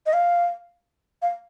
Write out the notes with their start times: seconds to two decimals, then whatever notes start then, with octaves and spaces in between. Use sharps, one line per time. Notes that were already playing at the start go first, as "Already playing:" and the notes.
0.06 D#5
0.13 F5
1.22 F5